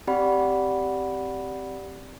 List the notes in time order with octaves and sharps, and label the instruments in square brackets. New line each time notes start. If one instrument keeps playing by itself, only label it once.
[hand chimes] C4 G4 D5 F#5 B5